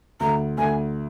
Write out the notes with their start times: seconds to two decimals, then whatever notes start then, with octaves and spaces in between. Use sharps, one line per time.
0.20 D2 A#5
0.58 D2 G#5